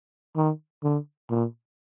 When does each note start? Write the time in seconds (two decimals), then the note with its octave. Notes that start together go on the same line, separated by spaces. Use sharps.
0.36 D#3
0.83 D3
1.30 A#2